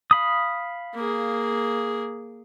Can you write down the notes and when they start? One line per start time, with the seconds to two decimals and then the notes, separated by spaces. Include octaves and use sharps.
0.11 F5 B5 D#6
0.94 A#3 G#4